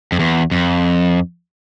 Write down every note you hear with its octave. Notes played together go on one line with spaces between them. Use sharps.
F2
E2
F2